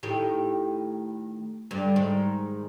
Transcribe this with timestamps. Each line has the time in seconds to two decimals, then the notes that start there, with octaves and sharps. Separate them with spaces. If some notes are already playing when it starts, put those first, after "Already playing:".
0.03 A2 D#3 G4
1.71 G2 D3
1.96 G#2 D#3